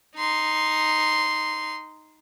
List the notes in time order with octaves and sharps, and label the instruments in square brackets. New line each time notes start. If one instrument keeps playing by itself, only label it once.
[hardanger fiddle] D#4 C6